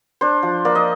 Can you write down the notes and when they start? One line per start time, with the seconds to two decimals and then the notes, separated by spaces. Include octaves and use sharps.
0.21 D4 C5
0.43 F3
0.65 A#3 D5
0.75 D#5